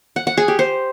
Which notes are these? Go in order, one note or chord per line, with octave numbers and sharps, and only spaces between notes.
F#5
F#5
G#4
G4
C5